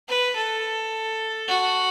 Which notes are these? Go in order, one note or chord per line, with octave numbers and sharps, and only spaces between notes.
B4
A4
F#4